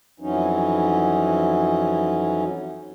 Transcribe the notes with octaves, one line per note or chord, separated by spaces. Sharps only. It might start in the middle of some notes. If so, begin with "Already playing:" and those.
F2 E3 F#3 C#4 D#4